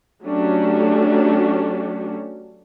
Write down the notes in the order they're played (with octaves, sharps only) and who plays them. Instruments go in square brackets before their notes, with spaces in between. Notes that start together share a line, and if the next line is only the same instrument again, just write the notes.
[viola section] F#3 A3 C#4 D4 F#4 G4